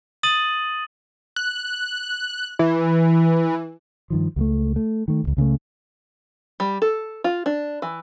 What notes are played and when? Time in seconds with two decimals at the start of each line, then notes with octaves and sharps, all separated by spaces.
0.23 D#6 A6 D#7 F#7
1.36 F#6
2.59 E3
4.10 G2 D#3 F3
4.36 C#2 G3 A3
4.76 A3
5.08 D#3 A3
5.24 D#1 C#2
5.37 C#2 C#3 F#3 A3
6.60 G3
6.82 A4
7.24 F4
7.46 D4
7.82 E3